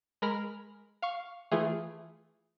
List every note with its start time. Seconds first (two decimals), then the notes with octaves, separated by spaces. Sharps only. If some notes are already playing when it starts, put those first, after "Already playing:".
0.22 G#3 A#4 A#5 B5 F6
1.02 F5 C#6
1.51 E3 A3 F4 G#4